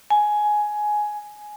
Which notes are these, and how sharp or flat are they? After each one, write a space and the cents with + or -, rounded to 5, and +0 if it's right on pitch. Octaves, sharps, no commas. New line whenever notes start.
G#5 +10